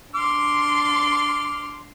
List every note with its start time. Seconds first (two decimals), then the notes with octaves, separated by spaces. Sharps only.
0.15 D4 C6 D6 F6